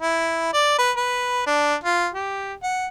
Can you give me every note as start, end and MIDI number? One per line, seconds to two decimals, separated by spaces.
0.01 0.53 64
0.54 0.77 74
0.79 0.92 71
0.97 1.42 71
1.47 1.75 62
1.84 2.08 65
2.14 2.54 67
2.63 2.88 78